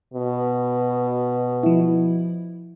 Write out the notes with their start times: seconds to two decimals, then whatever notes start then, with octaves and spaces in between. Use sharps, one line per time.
0.14 B2
1.63 F3 E4